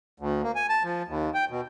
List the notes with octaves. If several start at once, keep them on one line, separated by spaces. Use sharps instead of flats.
D2
A#3
G#5
A5
F3
D#2
G5
B2